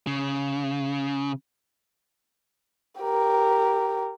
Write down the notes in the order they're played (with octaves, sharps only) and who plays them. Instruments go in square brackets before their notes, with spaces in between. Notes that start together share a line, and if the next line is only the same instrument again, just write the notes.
[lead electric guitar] C#3
[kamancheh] G4 A#4